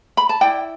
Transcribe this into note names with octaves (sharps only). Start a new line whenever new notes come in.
B5
A5
E4 D5 G5